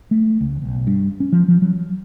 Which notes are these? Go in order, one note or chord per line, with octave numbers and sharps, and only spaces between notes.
A3
C#2
B1
G2
C#4
F3
F3
F#3